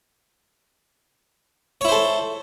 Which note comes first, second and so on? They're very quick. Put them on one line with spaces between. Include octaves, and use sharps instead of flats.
C#5 E4 C5 A4